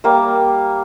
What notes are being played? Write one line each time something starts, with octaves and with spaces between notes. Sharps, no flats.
G3 A#3 D6